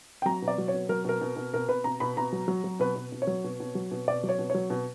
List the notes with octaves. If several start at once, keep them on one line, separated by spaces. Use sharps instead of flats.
G5
F#3 A#5
B2
D5
F#3
C#5
B2
F#3 A#4
B2 A#4
B2
B2
B2 A#4
B2 B4
B2 A#5
B2 B5
B2 A#5
F#3
F#3
F#3
B2 B4
B2
B2
C#5
F#3
B2
B2
F#3
B2
B2 D5
F#3
C#5
B2
F#3 C#5
B2